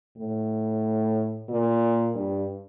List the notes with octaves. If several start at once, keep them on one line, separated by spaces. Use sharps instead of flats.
A2
A#2
G2